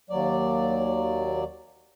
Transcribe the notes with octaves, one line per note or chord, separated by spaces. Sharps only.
D#2 F#3 D5